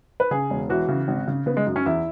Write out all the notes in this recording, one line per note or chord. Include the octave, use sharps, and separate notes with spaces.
B4
C#3 G#4
E1
E3 F#4
C#3
G#1
C#3
C#3 B3
G#3
F#2
C#4
E2 E4